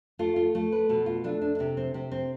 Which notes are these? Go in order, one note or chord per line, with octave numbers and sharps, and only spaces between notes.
A3 F4
F4
A3
B4
B2 A4
F4
A3 D4
D4
D4
C3 C4
C4
C3 C4
C4